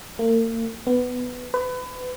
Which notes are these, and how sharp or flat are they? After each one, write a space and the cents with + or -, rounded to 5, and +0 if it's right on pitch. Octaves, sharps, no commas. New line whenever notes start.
A#3 -40
B3 +10
B4 +30